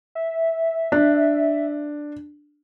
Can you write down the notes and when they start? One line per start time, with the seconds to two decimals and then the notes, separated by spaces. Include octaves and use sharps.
0.15 E5
0.92 D4